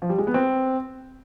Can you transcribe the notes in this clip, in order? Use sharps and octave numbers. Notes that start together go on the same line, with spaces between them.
F3
G3
G#3
B3
C4